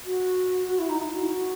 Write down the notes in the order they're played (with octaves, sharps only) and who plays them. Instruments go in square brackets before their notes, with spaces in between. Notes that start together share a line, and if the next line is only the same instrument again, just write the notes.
[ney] F#4
F#4
E4
D#4
E4
F#4